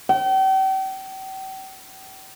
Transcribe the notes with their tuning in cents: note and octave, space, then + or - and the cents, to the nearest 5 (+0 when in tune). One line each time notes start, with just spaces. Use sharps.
G5 -40